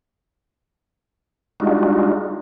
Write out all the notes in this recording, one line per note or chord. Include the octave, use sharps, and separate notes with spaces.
G3 G#3 D4 D#4 F4 F#4